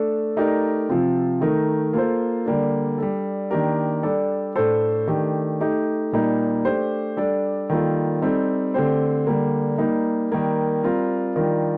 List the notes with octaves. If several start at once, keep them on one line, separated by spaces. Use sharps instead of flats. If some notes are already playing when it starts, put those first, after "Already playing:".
Already playing: A3 D4 A4
A3 D#4 G4 A#4 D5
C3 F3 C4 F4
D#3 A3 D#4 A#4
A#3 F4 A4 C5
D3 G3 A#3 D4
G3 D4 A4
D#3 A#3 D4 G4 A#4
G3 D4 A4 D5
A2 A3 D4 A4 C5
D#3 A3 D4 G4
A3 D#4 G4
A#2 G3 A#3 D#4
A3 D4 G4 C5
G3 D4 A4 D5
D#3 G3 A#3 F4 A4
G3 C4 D#4 A4
D3 A3 C4 G4 C5
D3 G3 A#3
G3 A#3 D#4
D#3 G3 A#3
G3 C4 F4 A#4
D#3 G3 D4 F4 A#4